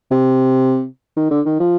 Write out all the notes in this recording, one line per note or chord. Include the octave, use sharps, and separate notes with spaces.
C3
D#3
D3
D#3
F3